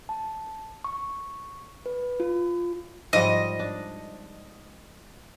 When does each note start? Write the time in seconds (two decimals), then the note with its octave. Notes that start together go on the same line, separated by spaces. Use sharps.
0.09 A5
0.84 C#6
1.86 B4
2.20 F4
3.13 G#2 F3 G3 D#5
3.59 D4